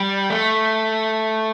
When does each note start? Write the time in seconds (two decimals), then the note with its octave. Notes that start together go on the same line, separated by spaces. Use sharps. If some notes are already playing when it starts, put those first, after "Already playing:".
Already playing: G3
0.30 A3